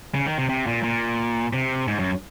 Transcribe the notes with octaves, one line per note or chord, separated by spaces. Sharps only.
C#3
D#3
C3
C3
A#2
A#2
C3
G#2
F#2